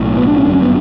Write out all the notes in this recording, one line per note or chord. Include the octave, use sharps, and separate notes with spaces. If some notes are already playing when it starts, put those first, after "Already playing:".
Already playing: B1 A2
B3
D4
C#4
G1 F#2 D3 D4
C#4
B3